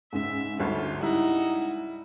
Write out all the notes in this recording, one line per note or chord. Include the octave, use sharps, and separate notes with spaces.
C#2 G#2 E5
G1 D2 F4
G3 D#4 E4 F#4